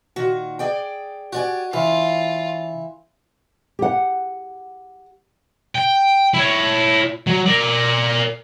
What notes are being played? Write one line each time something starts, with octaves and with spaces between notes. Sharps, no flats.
A#2 D#3 F#4
G#4 D5 G5
F#4 G4 D5 G#5
C#3 E3 F4
G4 F#5
G5
E4 C#5
F#3
A#4 D5